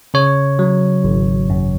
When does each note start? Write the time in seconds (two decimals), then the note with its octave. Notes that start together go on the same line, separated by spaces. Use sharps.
0.14 C#3 C#5
0.59 F#3
1.04 G#1
1.50 F#2